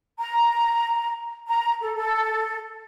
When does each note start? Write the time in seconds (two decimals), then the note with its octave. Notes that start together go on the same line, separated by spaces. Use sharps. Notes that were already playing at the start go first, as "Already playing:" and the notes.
0.19 A#5
1.48 A#5
1.81 A4
1.96 A4